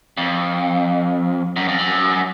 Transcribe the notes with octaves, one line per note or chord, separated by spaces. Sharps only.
F2
F#2
F2
F#2